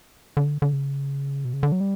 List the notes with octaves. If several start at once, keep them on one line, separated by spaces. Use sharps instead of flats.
D3
D3
C#3
B2
C#3
D3
F#3
G3